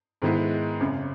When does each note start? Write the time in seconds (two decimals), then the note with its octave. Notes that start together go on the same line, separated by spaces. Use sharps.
0.22 G#2 D#3 G#3 B3 E4
0.80 G#1 F#2 C#3